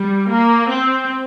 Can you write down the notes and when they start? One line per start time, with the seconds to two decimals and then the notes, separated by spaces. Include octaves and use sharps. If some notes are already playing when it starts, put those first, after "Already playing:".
Already playing: G3
0.29 A#3
0.68 C4